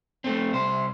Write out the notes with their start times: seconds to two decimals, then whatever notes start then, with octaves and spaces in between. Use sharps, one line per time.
0.24 A3 C4
0.51 C2 C5